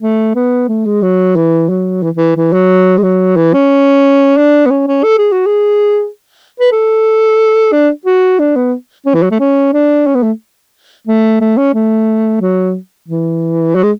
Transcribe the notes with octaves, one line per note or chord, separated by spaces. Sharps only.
A3
B3
A3
G#3
F#3
E3
F#3
E3
E3
E3
F#3
G#3
F#3
E3
C#4
D4
B3
C#4
C#4
A4
G#4
F#4
G#4
B4
A4
D4
F#4
D4
B3
C#4
E3
F#3
A3
C#4
D4
C#4
B3
A3
A3
A3
C#4
A3
F#3
E3
F#3
G#3